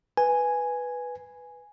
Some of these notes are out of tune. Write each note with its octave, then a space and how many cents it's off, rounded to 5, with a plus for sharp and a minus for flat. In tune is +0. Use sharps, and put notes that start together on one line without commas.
B4 +0 G#5 +0